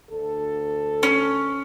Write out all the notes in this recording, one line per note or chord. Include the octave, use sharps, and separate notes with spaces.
D2 A4
C#4